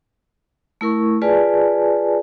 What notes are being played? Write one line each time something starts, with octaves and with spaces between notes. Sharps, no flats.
A3 E4 A#4 C#6
F4 G#4 B4 D5 G#5 A5